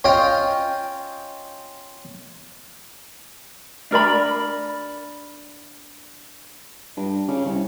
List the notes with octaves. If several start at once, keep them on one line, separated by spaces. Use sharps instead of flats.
C#4 F4 C#5 D#5 G5
D4 A#4 D5 B5
G2
C#3
C2